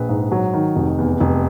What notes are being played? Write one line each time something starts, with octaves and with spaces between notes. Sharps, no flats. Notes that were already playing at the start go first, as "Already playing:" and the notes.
Already playing: A#1 B4
G#2
F#3
D#3
F1
E2
F1